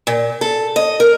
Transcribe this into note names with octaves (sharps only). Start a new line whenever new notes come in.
A#2
A4
D#5
A#4